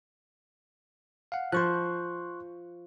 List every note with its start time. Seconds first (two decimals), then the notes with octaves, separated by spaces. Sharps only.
1.32 F5 F#5
1.52 F3 C5 C6 C#6 F#6